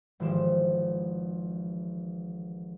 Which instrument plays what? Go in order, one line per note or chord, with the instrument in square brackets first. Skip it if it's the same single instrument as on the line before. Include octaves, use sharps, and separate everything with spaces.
[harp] G#1 E3 F3 G4 C6 E7